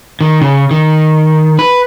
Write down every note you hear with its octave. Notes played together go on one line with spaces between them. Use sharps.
D#3
C#3
D#3
B4